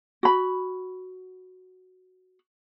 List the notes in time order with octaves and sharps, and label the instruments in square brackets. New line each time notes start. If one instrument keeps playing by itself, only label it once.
[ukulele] F#4 B5